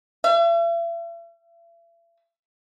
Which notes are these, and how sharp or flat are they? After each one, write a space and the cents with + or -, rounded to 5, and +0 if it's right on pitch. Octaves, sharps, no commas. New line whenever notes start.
E5 +40